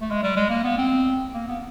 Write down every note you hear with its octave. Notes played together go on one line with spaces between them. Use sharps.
A3
G#3
G3
G#3
A#3
B3
C4
A#3
B3